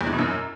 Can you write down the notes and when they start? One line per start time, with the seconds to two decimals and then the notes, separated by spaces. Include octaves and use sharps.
0.01 E2
0.07 E3
0.13 B2
0.19 F#2